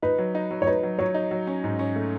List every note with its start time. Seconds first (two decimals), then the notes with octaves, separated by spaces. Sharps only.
0.02 D#4 B4
0.18 F#3
0.35 D#4
0.51 F#3
0.62 C#5
0.67 D#4 B4
0.83 F#3
0.99 F#3 C#5
1.14 D#4
1.31 F#3
1.47 C#4
1.64 G#2
1.79 C#4
1.96 A3